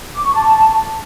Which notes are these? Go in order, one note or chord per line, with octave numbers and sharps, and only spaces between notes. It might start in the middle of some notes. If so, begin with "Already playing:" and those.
D6
C#6
A5